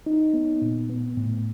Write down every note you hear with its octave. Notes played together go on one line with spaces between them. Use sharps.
D#4
B3
A#2
B3
A2